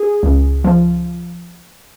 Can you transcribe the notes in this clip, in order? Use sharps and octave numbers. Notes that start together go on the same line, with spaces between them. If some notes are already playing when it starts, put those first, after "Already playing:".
Already playing: G#4
C#2
F3